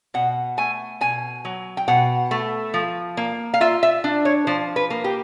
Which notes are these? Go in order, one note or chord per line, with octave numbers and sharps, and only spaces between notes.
B2 F#5
A3 G#5
B2 G#5
F#3
G5
B2 F#5
A3
F3
A#3
F5
F4 E5
E5
D4
C#5
F3 C5
B4
A#3
G4